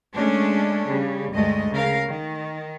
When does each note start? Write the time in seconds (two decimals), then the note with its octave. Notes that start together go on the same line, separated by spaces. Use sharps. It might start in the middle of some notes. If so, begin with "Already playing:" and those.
0.15 G#3 A3 C#4 D4
0.88 C#3 G3
1.32 D2 G2 G#3 A3 D#5
1.72 C#3 A#4 F5
2.07 D#3